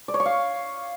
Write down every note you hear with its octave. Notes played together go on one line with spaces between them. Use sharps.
D5
C#5
C#6
F5